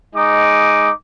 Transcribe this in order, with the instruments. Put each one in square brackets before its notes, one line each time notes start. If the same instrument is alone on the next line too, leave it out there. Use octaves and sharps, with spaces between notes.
[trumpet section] G#3 D#4 D6 D#6